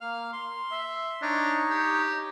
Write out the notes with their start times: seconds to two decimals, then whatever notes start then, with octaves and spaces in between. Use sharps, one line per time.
0.01 A#3 F5 F6
0.33 C6
0.71 E5
1.22 D4 D#4 C#5 D#5
1.70 G4